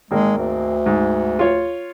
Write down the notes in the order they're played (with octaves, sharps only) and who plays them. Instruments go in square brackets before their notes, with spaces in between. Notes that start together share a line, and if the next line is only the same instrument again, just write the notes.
[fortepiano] G#1 A#3 [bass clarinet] G#3
[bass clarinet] D2
[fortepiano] G#2
F4 C#5